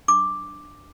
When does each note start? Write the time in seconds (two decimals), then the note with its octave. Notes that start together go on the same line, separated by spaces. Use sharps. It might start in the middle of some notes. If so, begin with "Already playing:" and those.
0.08 D4 D6